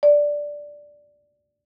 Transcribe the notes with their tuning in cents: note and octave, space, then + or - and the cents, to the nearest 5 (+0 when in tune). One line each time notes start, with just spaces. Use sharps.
D5 +0